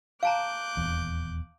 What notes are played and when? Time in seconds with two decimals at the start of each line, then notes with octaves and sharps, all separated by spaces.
0.23 F5 A5 A#5 D6 F#6 G6
0.77 D#1 E2